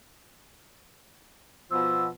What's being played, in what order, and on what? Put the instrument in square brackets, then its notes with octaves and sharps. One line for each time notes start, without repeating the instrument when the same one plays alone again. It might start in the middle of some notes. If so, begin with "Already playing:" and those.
[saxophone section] B2 F3 [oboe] E6